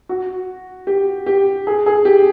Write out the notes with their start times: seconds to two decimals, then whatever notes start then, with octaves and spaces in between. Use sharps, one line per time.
0.09 F#4
0.87 G4
1.26 G4
1.67 G#4
1.86 G#4
2.05 G4